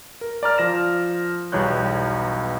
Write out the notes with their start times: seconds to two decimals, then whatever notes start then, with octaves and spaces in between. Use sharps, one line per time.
0.21 A#4
0.43 D5 A#5 F6
0.58 F3 A#6 E7
1.52 B1 E2 G3 C#5 F#6 G6